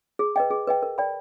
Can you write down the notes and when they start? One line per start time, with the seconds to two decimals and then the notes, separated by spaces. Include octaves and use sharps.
0.19 G#4
0.36 B4 D#5 G5
0.51 G#4
0.67 B4 D#5 G5
0.83 A#4
0.98 D5 G5 B5